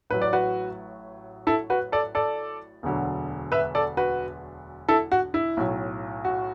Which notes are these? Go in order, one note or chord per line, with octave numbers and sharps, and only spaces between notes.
A1 A2 F#3 B4
D5
F#4 B4
E4 A4
F#4 B4
A4 D5
A4 D5
E1 D2 D3 F#3
B4 E5
A4 D5
F#4 B4
E4 A4
F#4
E4
B1 A2 F#3
F#4